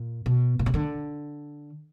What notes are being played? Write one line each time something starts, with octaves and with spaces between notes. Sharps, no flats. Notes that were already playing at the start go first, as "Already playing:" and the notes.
Already playing: A#2
B2
A#2
B2
D3